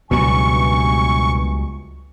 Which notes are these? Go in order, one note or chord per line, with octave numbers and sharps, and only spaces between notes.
C#2 G2 B2 E3 F#3 G#5 C#6